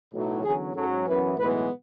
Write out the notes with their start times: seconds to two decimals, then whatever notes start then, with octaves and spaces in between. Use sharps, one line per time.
0.13 B1 A2 F#3
0.44 E2 D3 F#3 C#4 G#4
0.75 G#2 F#3 C#4 A4
1.07 F#2 E3 B3 B4
1.37 B1 A2 E3 G#3 B3 B4